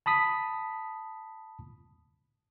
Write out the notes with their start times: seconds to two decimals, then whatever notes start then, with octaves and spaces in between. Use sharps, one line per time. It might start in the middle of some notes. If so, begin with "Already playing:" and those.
0.06 A5 B5 D#6 B6